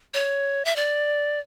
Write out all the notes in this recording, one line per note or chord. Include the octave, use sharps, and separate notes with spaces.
C#5
E5
D5